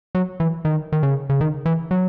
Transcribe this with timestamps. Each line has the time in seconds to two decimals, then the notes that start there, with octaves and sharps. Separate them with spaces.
0.15 F#3
0.40 E3
0.65 D#3
0.92 D#3
1.03 C#3
1.30 C#3
1.41 D#3
1.66 E3
1.91 F#3